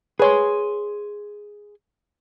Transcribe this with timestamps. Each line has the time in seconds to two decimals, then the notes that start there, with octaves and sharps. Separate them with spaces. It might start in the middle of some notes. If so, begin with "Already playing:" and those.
0.19 G#4 B4 C#5 G#5 C6